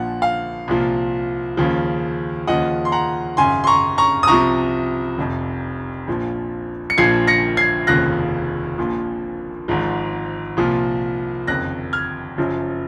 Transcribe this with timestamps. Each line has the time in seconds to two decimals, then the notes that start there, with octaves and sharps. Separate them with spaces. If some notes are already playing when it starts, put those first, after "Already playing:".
Already playing: A#1 A#2 F3 F#5
0.22 F5
0.68 C2 A#2 F3
1.57 D#2 C#3 F3
2.47 D#2 C#3 F3 D#5 F#5
2.85 C6
2.92 F#5 A#5
3.37 G#1 F#2 C#3 G#5 C6
3.64 C6
3.67 A#5 C#6
3.98 A#5 C#6
4.23 D#6
4.27 C2 C3 F3 A#5 C#6
5.17 F1 F2 C3
6.08 A#1 A#2 F3
6.90 C#7
6.98 A#1 A#2 F3 G#6 C7
7.27 A#6 C#7
7.57 G#6 C7
7.87 F1 D#2 C#3 F3 F#6 A#6
8.78 A#1 A#2 F3
9.68 G#1 G#2 F3
10.57 C2 A#2 F3
11.47 F#1 F2 D#3 F#6 A#6
11.93 F6 G#6
12.37 F#1 F#2 F3